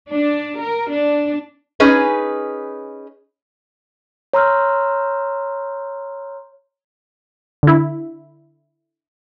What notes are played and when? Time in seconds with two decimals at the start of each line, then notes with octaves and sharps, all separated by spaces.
0.10 D4
0.59 A#4
0.91 D4
1.80 C#4 D#4 G#4 B4
4.33 C#5 A#5 C6 E6 F6 G6
7.63 D3 E4